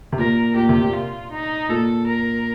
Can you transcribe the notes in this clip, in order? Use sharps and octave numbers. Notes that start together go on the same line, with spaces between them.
C3
A#2 A#4
A#2 G4
C3
A#2
F4
D#4
A#2 A4
A#4